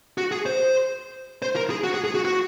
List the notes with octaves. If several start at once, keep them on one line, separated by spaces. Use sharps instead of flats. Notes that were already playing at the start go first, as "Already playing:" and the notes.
F#4
G#4
C5
C5
A#4
G#4
F#4
G#4
G#4
F#4
F#4